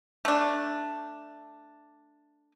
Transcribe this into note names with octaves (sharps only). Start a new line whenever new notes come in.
A3 D4